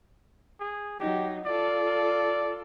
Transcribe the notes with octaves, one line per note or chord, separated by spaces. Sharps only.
G#4
F#3 D#4 G4
F4 A4 D5